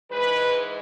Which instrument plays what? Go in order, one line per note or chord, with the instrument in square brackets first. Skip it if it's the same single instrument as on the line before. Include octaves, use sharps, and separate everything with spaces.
[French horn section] G#2 E3 G#3 B4